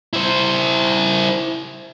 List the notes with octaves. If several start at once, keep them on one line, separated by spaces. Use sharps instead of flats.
E4 C5